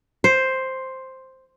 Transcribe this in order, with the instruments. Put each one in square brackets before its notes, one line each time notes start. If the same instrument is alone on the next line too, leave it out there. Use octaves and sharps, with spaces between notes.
[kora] C5